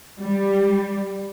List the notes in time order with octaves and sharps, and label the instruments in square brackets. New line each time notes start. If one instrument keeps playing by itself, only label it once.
[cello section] G3